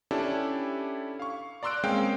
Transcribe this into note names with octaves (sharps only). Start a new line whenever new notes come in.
C#4 D4 E4 G4 A4
F5 C#6
D5 A#5 C6 E6 F#6 D7
G#3 A#3 C4 C#4 F5 G5